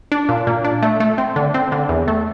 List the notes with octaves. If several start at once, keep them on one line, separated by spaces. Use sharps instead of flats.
D4
A#2
A#2
D4
A3
A3
C4
D3
C4
D3
E2
A3